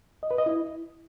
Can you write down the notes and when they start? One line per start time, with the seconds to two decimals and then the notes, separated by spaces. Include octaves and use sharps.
0.23 D#5
0.31 B4
0.38 D#5
0.46 E4